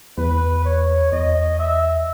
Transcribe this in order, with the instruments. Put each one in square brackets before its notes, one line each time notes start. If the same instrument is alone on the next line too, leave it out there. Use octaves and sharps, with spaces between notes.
[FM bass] E2 [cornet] B4
[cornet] C#5
[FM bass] E2 [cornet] D#5
[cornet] E5